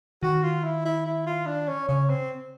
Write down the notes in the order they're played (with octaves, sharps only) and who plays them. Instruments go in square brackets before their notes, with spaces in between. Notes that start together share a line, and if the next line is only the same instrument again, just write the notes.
[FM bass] D#3 [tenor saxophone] F#4
[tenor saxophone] F4
E4
E4
E4
F4
D4
C#4
[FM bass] C#3 [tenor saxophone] C#4
[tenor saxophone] C4